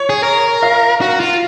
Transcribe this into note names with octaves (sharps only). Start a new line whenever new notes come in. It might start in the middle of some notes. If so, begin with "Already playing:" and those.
Already playing: C#5
G#4
A#4
F5
F#4
F4